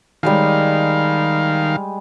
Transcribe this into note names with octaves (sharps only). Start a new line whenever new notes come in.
D#3 G3 G#3 G#4 F5